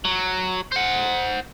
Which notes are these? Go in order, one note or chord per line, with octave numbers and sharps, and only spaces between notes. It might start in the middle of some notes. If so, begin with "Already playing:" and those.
F#3
C5 F#5